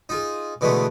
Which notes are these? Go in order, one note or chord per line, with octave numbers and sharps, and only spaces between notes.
D#4 F4 G#4
B2 D3 E3 G#3 A3 B3